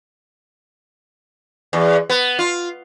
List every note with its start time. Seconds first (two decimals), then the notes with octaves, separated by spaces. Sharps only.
1.73 E2
2.10 B3
2.39 F4